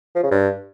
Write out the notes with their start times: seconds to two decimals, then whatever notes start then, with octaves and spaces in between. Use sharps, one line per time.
0.15 F3
0.23 C#3
0.31 G2